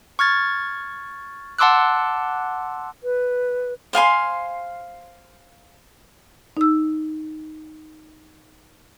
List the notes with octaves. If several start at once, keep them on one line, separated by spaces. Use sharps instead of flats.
C#6 F6 G#6 A6
F#5 A5 C6 D6 E6 F#6
B4
C5 F5 G#5 C6
D#4 E6